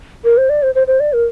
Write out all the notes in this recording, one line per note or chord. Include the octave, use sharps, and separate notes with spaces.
A#4
C5
D5
C5
C5
C5
D5
A#4